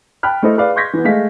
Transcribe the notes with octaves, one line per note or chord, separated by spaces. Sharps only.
G5 A5 B5 F6 F#6
A3 E4 A4 C5 D#5
G#4 B4 D5 F5
C6 C#6 G6 G#6 A#6 B6
E3 B3
G#3 A3 F5 B6